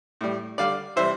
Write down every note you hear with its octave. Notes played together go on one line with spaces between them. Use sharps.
A2 G3
D3 G3 D5 F5
C3 E3 G3 C5 E5